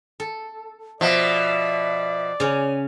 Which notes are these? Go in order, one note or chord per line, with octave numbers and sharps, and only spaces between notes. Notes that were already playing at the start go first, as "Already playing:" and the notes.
A4
B2 F3 D5 E5
C#3 C#4 G#5